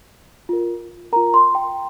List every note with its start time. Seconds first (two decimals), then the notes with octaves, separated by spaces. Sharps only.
0.49 F4 A#4
1.12 F4 A#4 A#5
1.34 C6
1.55 G5